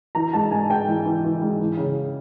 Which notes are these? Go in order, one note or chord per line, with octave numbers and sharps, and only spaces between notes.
E3 A#5
G#2 A5
G#2 G#5
G#2 G5
E3
E3
E3
G#2
E3
C#3